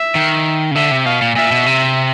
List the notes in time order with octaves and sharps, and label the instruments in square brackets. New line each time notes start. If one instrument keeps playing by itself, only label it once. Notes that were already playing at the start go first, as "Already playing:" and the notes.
Already playing: [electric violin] E5
[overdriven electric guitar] D#3
C#3
[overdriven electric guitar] D3 [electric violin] E5
[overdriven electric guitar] C3
[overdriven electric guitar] B2 [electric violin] F5
[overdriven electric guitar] A#2
[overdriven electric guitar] A#2 [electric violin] E5
[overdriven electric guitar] B2
C3